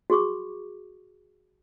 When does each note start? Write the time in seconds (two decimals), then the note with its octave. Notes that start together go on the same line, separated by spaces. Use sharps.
0.10 F#4 G#4 C#6 D6